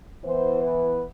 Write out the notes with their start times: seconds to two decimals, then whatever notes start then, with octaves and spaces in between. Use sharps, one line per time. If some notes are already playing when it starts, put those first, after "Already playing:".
0.22 E3 B3 C5
0.62 B4